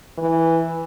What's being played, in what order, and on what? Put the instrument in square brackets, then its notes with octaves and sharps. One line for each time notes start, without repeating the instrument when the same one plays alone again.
[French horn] E3